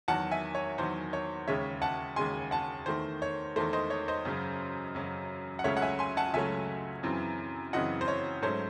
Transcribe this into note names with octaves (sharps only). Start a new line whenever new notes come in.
E2 D#3 F#3 F#5 A5
E5 G#5
C#5
E2 D#3 F#3 C5
C#5
D#2 C#3 G#3 C#5 E5
F#5 A5
D#2 C#3 G#3 G#5 C6
F#5 A5
E2 D#3 A3 C5
C#5
E2 D#3 A3 C5
C5 D#5
C#5
C5 D#5
F#2 C#3 F#3
F#2 C#3 F#3
F#5
C#2 C#3 F#3 A3 C#4 C#5 E5
F#5
E5 G#5
G#5 C6
F#5 A5
C#2 C#3 F#3 A3 C#4 E5 G#5
F#2 C#3 E3 C4
F#2 C#3 E3 C4 D#5 F#5
C5
C#5
G#2 F#3 A3 C#4 C5